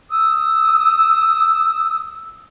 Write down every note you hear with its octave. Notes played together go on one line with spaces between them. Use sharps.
D#6 E6